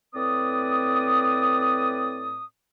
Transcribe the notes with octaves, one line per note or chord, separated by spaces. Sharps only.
A2 C4 B4 D5 D#6